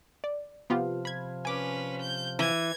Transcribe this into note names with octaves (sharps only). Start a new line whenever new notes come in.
D5
C3 F3 B3 F4 G4
B5 G#6
C#4 B4 G#5 D6
G6
E3 G#6